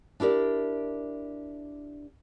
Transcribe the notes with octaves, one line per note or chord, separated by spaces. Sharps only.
D4 E4 G4 A#4 D5